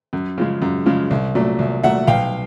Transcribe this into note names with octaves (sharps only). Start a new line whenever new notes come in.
F#2
C#3 F3 G#3
F#2
C#3 F3 G#3
C2
A#2 F#3 A3
C2
A#2 F#3 A3 E5 F#5
B1 F5 G5